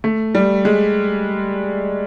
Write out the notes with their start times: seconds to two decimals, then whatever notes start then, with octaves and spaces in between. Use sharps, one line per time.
0.04 A3
0.35 G3
0.65 G#3